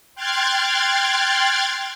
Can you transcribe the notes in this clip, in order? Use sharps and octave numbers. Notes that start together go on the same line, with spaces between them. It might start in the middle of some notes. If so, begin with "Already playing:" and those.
G5 C6 F6 F#6 G#6 A6